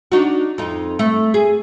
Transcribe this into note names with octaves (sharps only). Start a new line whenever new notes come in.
D4 D#4 F#4
F2 D#4
A3
G#4